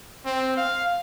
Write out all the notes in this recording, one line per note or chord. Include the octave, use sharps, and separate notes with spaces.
C4
F5